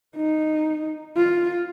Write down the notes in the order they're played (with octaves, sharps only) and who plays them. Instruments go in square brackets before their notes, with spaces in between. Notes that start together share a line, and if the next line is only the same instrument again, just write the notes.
[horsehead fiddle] D#4
F4